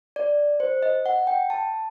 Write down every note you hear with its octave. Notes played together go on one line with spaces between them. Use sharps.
D5
C5
D#5
F#5
G5
A5